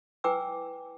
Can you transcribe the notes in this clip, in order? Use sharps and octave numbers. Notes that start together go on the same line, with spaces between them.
E4 B4 G5 G#5 D6 E6